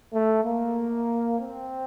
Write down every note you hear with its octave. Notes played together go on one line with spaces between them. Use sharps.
A3
A#3
C4